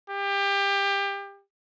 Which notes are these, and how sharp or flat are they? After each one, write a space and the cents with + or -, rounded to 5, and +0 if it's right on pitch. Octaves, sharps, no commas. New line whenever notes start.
G4 +25